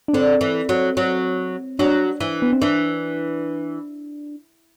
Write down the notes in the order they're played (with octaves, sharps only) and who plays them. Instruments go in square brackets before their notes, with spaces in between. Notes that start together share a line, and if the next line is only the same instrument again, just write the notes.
[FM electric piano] D4
[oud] D3 [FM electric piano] C4
[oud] E3
F#3
F#3
[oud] F#3 [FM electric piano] D4
[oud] E3
[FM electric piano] B3
C4
[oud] E3 [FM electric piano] D4